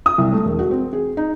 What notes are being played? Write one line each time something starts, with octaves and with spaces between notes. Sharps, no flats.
D#6
C2
A3
E1
F#4
C4
G#4
D#4